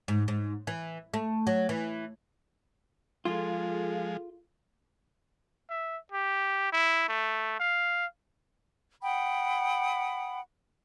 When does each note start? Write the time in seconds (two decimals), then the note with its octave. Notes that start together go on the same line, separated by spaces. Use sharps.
0.08 G#2
0.28 G#2
0.67 E3
1.14 A3
1.47 F#3
1.69 E3
3.25 F3 G#3 F4 G#4 A4 F5
5.70 E5
6.12 G4
6.72 E4
7.09 A3
7.60 F5
9.02 F#5 G5 B5 D#6